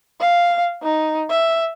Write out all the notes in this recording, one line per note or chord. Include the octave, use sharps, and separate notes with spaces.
F5
D#4
E5